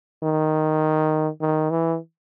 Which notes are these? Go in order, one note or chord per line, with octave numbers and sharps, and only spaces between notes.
D#3
D#3
E3